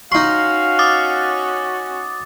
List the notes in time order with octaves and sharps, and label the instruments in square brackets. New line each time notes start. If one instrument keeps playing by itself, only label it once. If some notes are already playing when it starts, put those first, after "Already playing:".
[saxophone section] C#4 F#4 [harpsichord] D#4 C6 [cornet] F5 [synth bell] C#6
[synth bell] D6 D#6 A6